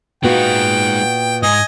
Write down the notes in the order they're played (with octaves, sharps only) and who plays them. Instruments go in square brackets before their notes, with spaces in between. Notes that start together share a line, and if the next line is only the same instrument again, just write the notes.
[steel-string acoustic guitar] A#2 B3 F#4 [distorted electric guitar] G#3 D#4 [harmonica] G5
[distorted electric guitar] G#2 [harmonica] D#5 G#5